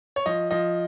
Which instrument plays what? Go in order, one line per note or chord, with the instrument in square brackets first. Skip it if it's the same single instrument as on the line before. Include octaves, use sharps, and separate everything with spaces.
[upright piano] C#5
F3 D#5
F3 D#5